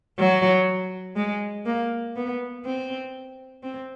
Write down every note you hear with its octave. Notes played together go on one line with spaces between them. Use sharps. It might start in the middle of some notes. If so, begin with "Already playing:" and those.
F#3
G#3
A#3
B3
C4
C4